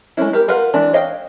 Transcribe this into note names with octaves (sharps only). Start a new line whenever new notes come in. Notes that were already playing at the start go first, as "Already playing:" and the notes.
G#3 A3 C4 C#4 E4
E4 G4 A#4
F4 A#4 B4 F5 F#5
E3 G#3 D4
C#5 D#5 F5 G5